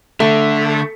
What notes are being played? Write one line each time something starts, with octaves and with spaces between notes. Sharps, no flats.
D3 A3